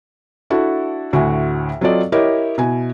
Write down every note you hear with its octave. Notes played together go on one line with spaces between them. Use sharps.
D4 E4 F#4 A4
D2 A2 F#4 G#5
F#3 C4 F4 A4 D5 D#5
E4 G4 A#4 C#5 D#5
B2 E4 G#5